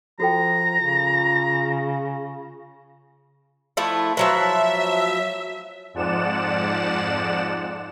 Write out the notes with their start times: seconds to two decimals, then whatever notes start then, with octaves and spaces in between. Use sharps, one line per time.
0.20 F3 F#4 A4 G5 A#5
0.81 C#3 F4
3.77 F3 A3 E4
4.17 F3 F#3 B4 E5
5.94 F2 G#2 F3 D5 F#5 E7